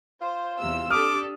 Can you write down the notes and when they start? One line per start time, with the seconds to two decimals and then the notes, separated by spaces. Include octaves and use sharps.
0.21 F4 C5
0.59 E2 C3 E6
0.90 D4 G4 A4 D6 D#6 F6